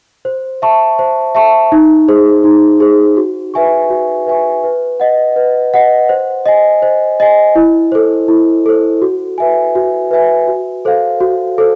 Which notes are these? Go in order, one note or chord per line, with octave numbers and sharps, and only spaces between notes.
C5
E5 A5 C#6
C5
E5 A5 C#6
D#4
G#4 C5
D#4
G#4 C5
F#4
B4 E5 G#5 C#6
F#4
B4 E5 G#5 C#6
B4
D#5 F#5
B4
D#5 F#5
C5
D#5 G#5
C5
D#5 G#5
E4
A4 C5
E4
A4 C5
F#4
B4 E5 G#5
F#4
B4 E5 G#5
F#4
A4 C5 F5
F#4
A4 C5